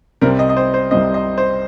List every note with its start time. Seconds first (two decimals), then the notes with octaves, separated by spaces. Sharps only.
0.21 C2 C3 G3 C4 A#4
0.39 D#5
0.49 D#5
0.57 C5
0.74 C5
0.91 C2 C3 G3 C4 D#5
1.14 D#5
1.38 C5